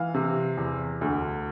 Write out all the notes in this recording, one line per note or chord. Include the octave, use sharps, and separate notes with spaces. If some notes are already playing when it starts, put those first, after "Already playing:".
Already playing: E3 F5
C3
E2
D2